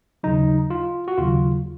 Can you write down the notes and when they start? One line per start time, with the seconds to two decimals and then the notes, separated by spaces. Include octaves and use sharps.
0.23 D#2 C#3 F#3 D#4
0.70 F4
1.08 F#4
1.18 D#2 C#3 F#3 F4